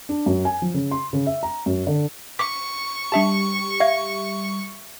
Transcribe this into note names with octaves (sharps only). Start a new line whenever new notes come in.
D4
F#2
G#5
F3
C#3
C6
C#3
E5
A#5
F#2
D3
C#6 D6 B6
G3 D4 G4 E5 A5
E5 F5 G#6